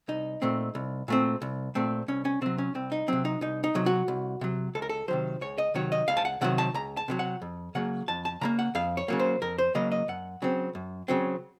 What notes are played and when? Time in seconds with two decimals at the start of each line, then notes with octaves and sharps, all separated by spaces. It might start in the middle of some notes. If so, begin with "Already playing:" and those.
0.08 C2 D#4
0.42 A#2 A3 C4
0.75 C2
1.08 A#2 A3 C4
1.42 C2
1.75 A#2 A3 C4
2.08 C2 C#4
2.25 C#4
2.41 C3 F#3 C4
2.58 C#4
2.75 C2 C4
2.92 D#4
3.08 C3 F#3 C4
3.25 D#4
3.41 C2 D#4
3.64 D#4
3.75 C3 F#3
3.86 F#4
4.08 C2
4.41 C3 F#3
4.75 C#2 A4
4.82 A#4
4.89 A4
5.08 C3 D#3 F#3 C5
5.41 C#2 C#5
5.58 D#5
5.75 C3 D#3 F#3 C#5
5.92 D#5
6.08 C#2 F5
6.17 A5
6.25 F#5
6.41 C3 D#3 F#3 F#5
6.58 A5
6.74 C#2 A#5
6.97 A5
7.08 C3 D#3 F#3
7.19 F#5
7.42 F2
7.75 C#3 F#3 A#3 F#5
8.08 F2 A5
8.25 A5
8.41 C#3 F#3 A#3 A#5
8.59 F#5
8.75 F2 F5
8.97 C#5
9.08 C#3 F#3 A#3
9.20 C5
9.42 F2 A#4
9.58 C5
9.75 C#3 F#3 A#3 D#5
9.92 D#5
10.08 F#2 F#5
10.42 C#3 F#3 C4
10.75 F#2
11.08 C#3 F#3 C4